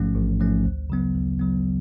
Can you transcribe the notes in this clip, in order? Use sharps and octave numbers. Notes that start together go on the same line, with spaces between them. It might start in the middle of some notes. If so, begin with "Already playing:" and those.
Already playing: A1 G#2 F3 A3 C#4
A1
G#2 F3 A3 C#4
D2
C#3 F#3 B3
D2
C#3 F#3 B3